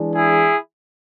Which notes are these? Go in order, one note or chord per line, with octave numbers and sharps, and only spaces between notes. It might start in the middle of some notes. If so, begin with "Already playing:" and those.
Already playing: E3 G#3 D4
E4 G#4